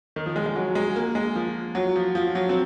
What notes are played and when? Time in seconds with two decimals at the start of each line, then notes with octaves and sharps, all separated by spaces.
0.16 D#3
0.26 F3
0.36 G#3
0.46 G#3
0.56 F#3
0.75 G#3
0.96 A#3
1.15 G#3
1.36 F3
1.75 F#3
1.96 F3
2.15 F3
2.35 F#3
2.49 C4